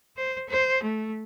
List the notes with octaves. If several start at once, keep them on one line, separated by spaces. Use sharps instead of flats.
C5
C5
A3